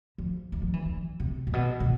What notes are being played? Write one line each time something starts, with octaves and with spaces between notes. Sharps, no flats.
F3
E3
F3
E3
D3
C3
A2
B2
B2